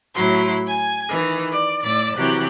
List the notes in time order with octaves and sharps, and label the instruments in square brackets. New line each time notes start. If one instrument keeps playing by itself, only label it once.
[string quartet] A2 F#3 E4 C6
G#5 G#6
D#3 E3
D5
A2 D5 E6 A6
C3 E3 F#3 G4 F#6